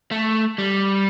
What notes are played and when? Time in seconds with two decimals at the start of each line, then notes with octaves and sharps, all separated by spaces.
0.11 A3
0.58 G3